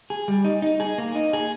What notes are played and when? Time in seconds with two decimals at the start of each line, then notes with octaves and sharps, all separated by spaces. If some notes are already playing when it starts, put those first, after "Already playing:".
0.10 G#4
0.28 G3
0.44 D#4
0.62 D#4
0.80 G#4
0.98 A#3
1.15 D#4
1.33 G#4